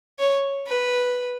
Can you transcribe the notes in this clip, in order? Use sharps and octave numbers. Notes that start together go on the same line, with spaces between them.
C#5
B4